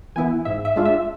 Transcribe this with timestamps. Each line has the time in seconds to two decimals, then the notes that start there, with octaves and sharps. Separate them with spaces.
0.16 E3 B3 E4 G#5
0.45 G#2 E5
0.65 E5
0.76 G#3 D4 F4
0.85 E5